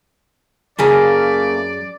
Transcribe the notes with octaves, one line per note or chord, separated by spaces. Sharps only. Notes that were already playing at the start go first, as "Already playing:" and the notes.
F#2 C#3 A3 A#3 G#4 D5